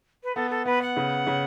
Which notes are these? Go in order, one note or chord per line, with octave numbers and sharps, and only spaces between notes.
B4
B3 A4
A4
B3 B4
F#5
C#3
C#3